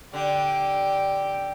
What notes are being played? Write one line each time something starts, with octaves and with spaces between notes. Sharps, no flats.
D3 G4